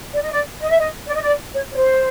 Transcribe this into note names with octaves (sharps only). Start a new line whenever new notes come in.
D5
D#5
D5
D#5
E5
D#5
D5
D#5
D5
C#5
C#5
C5